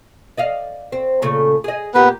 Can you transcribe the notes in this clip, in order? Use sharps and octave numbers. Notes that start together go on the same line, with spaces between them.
D5 D#5 F5
C4
A#2 C#3 A3
G#4 D#5
A#2 A#3 B3 G4 B4